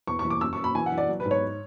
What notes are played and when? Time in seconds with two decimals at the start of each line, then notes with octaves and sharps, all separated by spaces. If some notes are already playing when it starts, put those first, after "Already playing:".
0.07 E2 C#6
0.19 C#6
0.25 E3
0.30 D6
0.41 F#2 E6
0.53 C#6
0.58 F#2
0.64 B5
0.75 E3 G#5
0.86 F#5
0.92 E3
0.98 D5
1.09 F#3
1.20 B4
1.26 G#2
1.31 C#5